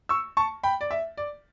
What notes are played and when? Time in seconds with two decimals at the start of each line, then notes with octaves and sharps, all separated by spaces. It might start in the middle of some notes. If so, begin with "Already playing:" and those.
0.09 C#6 E6
0.37 A5 C#6
0.63 G5 B5
0.81 D5
0.91 E5
1.17 D5